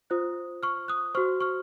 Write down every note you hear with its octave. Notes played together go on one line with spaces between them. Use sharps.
F4 C5 D#6 F#6
C#6 F6
D#6 F#6
F#4 C5 C#6 F6
C#6 F6